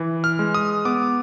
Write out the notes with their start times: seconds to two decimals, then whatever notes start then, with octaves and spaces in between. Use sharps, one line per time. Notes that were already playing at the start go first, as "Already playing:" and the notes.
Already playing: E3
0.24 F6
0.39 G#3
0.54 D#6
0.85 B3 D6